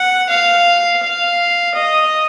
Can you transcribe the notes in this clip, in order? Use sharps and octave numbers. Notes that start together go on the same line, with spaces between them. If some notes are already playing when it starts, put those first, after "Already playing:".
Already playing: F#5
F5
F5
D#5